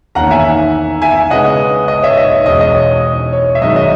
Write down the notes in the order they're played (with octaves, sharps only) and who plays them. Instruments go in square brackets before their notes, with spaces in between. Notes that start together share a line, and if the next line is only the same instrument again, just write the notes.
[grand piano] E2 D#3 A#3 C#4 F#5 A#5
E5 G#5
E5 G#5
C#3 G#3 B3 D#5 F#5
D#5
C#5 E5
D#5
C#5
E2 B2 G#3 C#4 D#5
D#5
C#5
C#5
E5
F#2 D#3 G#3 C#4 D#5
E5
D#5